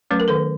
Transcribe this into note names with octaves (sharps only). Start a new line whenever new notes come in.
F#3 A3 C#4 B4
A#4
D#3 A4 B4